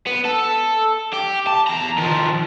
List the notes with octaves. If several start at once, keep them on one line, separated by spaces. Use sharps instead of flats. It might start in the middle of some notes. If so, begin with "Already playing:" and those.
B3
A4
G4
A5
E2 A#5
D#3 F3